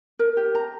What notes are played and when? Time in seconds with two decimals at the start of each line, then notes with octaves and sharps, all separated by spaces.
0.19 A#4
0.37 G4
0.55 A#5